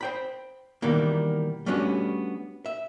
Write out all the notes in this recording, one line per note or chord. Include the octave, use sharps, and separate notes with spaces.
C5 G5 B5
B2 D#3 E3 G3 A#3
G3 A3 B3 C#4 D4 F#4
E5